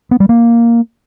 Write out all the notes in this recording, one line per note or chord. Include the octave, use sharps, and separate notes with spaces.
B3
G3
A#3